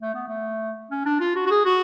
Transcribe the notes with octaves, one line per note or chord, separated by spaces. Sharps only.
A3
B3
A3
C#4
D4
F4
F#4
F#4
G#4
F#4